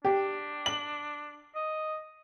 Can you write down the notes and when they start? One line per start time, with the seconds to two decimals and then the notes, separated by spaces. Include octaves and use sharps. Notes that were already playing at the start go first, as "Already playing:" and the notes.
0.05 D4 G4
0.66 F#7
1.55 D#5